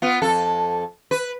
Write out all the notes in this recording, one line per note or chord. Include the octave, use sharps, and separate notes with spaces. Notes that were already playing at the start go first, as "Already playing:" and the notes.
B3 F4
F2 A4
B4